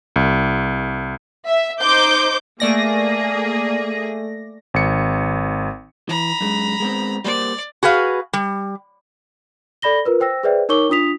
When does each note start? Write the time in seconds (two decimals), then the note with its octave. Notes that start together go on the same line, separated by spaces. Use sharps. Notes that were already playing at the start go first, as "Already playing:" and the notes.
0.16 C2
1.48 E5
1.81 D#4 C5 D6 G6
2.60 A3 A#3 G#4 D5 A#6
4.74 G#1 C#7
6.09 E3 A#5 B5
6.41 F#2 G#3
6.80 G#3 B3 C4
7.24 G3 A#3 C5 D5
7.83 F#4 G#4 B4 F5
8.33 G3
9.82 A4 D5 B5 A#6 G7
10.05 F4 A#4 B4
10.20 C5 G5 E6 A#6
10.43 G#4 B4 C5 D5 E5 G5
10.69 D#4 A#4 C#5 C#6 D6 G7
10.89 D4 F4 D#6 B6 F7